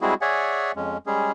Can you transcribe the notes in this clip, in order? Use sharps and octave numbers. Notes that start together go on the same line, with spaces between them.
G3 G#3 C4 E4 F#4 G#4
G#4 C#5 D5 E5 F#5 G#5
F2 G#3 C#4
G3 G#3 C#4 G#4